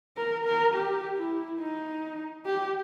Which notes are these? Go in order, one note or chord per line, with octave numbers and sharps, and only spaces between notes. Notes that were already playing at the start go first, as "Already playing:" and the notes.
A#4
A#4
G4
E4
D#4
G4